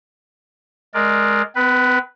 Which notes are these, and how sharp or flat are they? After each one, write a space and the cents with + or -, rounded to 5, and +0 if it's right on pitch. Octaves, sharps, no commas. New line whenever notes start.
G#3 +15 A#4 +0 D5 +15
B3 +45 B4 +0